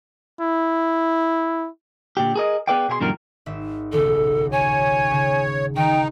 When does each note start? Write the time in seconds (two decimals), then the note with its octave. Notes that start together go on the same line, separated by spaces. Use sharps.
0.41 E4
2.17 A#2 D3 G4
2.36 G#4 A#4 D#5
2.68 B3 G#4 B4 D5 F5 G5
2.89 B2 G#4 B4 C6
3.01 F#2 A#2 D3 E3 G3 A#4
3.46 G#1 E5
3.92 D#1 B1 C#3 A4
4.52 C#5 G#5
5.11 C#3
5.76 D#3 D#4 G5